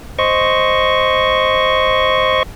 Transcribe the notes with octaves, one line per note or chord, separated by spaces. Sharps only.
C5 D#5 C#6